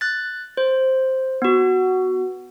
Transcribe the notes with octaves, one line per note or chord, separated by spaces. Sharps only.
F#6 A6
C5
B3 F#4